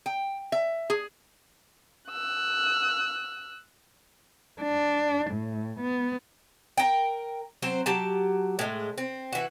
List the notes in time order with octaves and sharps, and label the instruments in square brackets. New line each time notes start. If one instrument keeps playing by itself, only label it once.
[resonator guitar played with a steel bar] G5
E5
G#4
[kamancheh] E6 F#6
[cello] D4
A2
B3
[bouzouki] A#4 G5
F#3 C4 C5
F#3 G4 A5
A2 G#3
C4
E3 F#4